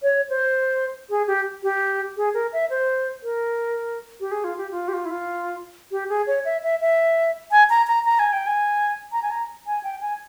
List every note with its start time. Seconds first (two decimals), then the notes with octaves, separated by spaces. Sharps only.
0.03 C#5
0.30 C5
1.10 G#4
1.27 G4
1.63 G4
2.17 G#4
2.34 A#4
2.53 E5
2.70 C5
3.23 A#4
4.20 G4
4.31 G#4
4.44 F4
4.58 G4
4.71 F4
4.88 G4
4.93 F4
5.05 E4
5.10 F4
5.91 G4
6.09 G#4
6.27 C#5
6.45 E5
6.63 E5
6.81 E5
7.51 G#5
7.70 A#5
7.87 A#5
8.05 A#5
8.19 G#5
8.33 G5
8.46 G#5
9.12 A#5
9.22 G#5
9.30 A#5
9.67 G#5
9.83 G5
10.01 G#5